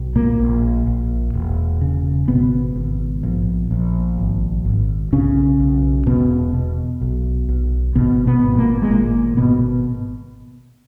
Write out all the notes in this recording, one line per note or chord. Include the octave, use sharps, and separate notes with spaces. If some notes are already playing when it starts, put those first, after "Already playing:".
Already playing: B1
A#2 A#3
A#1
A#1
E1
C#3
G#1 B2 B3
G#1
A#1
A#1
G#1
G#1
B1 C#3 C#4
B1
E1 B2 B3
B2
B1
B1
G#1 B2 B3
B2 B3
G#1
A#2 A#3
G#3
G#1 A#2 A#3
G#1 B2 B3